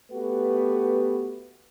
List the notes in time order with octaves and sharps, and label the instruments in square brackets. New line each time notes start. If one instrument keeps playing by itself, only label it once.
[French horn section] A3 B3 F#4 G4 B4